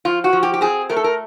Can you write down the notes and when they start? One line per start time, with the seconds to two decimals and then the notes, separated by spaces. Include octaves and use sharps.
0.05 F3 F4
0.24 F#4
0.33 F3
0.43 G4
0.54 G4
0.61 C4 G#4
0.89 A3 A#4
0.96 A4
1.04 A#4